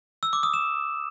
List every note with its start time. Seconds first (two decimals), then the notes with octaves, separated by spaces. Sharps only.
0.23 E6
0.33 D6
0.43 D#6
0.54 E7